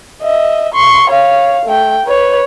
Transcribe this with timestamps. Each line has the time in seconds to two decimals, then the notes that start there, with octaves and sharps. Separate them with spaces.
0.22 D#5 E5
0.74 C6 C#6
1.10 C#5 F5
1.66 A3 G5
2.06 B4 C#5